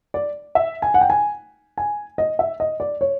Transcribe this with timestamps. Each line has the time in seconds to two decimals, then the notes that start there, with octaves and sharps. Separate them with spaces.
0.14 D5
0.55 E5
0.82 G#5
0.94 F#5
1.01 G5
1.10 G#5
1.78 G#5
2.18 D#5
2.39 E5
2.60 D#5
2.80 D5
3.01 C#5